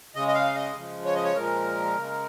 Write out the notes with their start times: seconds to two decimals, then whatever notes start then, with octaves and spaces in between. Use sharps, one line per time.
0.15 C#3 G#3 D#5
0.28 D#5
0.35 F5
0.55 D#5
0.76 C#3 F3 G#3
1.05 C#5
1.15 D#5
1.24 C#5
1.36 A#2 F3 G#3 A#4
1.97 C#3 G#3